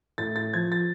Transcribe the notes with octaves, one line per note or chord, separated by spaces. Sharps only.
A2 A6
A6
F3 G#6
A6